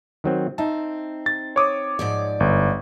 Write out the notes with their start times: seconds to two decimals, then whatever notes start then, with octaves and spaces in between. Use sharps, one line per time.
0.24 D#3 F#3 C4
0.58 C4 D#4 E5 A5
1.26 A6
1.56 C#5 D6 D#6
1.99 G#2 F3 D5
2.40 G1